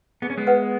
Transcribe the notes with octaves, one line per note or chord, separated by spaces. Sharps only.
B3 G#4
C#4
G#3 B3
B4 F#5